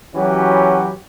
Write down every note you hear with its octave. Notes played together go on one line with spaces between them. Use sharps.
E3 F#3 C#4 F#4 G4